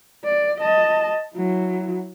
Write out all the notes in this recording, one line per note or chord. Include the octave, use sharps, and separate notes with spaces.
D5
D#5 A5
F#3 E4